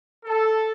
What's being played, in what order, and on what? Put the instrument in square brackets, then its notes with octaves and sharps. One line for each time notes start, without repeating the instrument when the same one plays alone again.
[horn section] A4